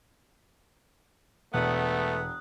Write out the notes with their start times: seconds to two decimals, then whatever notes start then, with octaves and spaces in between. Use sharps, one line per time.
1.54 E1 A3 B3 D#6 F#6